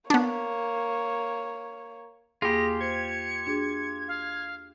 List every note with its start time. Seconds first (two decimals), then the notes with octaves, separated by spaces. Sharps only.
0.10 A#3 B3 D4 C#5
2.42 E2 A#3 F4 G4 G#4 B5 A#6
2.81 C5 G#6 C#7
3.47 D4 F#4 G#4
4.08 F5